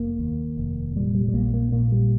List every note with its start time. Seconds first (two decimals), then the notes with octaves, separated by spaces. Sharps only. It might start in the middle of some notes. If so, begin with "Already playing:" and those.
Already playing: F1 A#3
0.19 D#2
0.57 F1
0.96 A#2 G3
1.15 G3
1.28 G3
1.34 A#1 A#3
1.54 A#3
1.72 A#2 A#3
1.92 G3